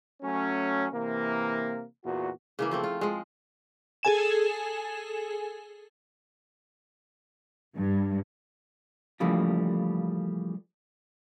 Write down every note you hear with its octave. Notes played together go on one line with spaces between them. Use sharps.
F#3 A3 C#4
C3 E3 A#3
E2 A#2 F#4
C#3 E3 A#3
F3 A3 C4
F4
F3 G#3
G#4 A4 G#5 E7
G2
C#3 E3 F3 G3 A3 A#3